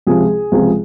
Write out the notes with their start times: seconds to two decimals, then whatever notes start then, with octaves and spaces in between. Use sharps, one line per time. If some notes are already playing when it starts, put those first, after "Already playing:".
0.07 C#2 C3 F3 C4 G#4
0.52 C#2 C3 F3 C4